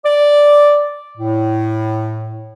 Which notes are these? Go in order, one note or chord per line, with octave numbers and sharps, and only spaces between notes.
D5
A2